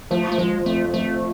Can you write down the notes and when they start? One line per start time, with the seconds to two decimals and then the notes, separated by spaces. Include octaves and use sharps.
0.11 F3 A3
0.32 A3
0.38 F3 G#3
0.66 F2 A3
0.93 F3 A3